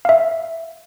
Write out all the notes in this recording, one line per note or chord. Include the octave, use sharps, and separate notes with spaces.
E5 F5